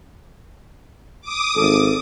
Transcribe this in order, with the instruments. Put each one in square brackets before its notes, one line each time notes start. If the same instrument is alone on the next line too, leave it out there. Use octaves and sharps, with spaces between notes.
[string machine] D6 D#6
[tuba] G#1 [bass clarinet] A4